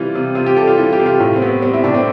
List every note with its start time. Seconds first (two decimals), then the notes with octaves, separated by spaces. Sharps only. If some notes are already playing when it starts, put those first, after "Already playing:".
Already playing: C3 E3 G3 F4
0.15 C3
0.35 C3 F4
0.46 G4
0.57 G3 A4
0.67 F4
0.77 E3 A4
0.93 G4
1.00 C3
1.06 F4
1.20 A2
1.36 C4
1.42 B3
1.62 G3 C4
1.74 E4
1.84 A2 D4
1.94 C4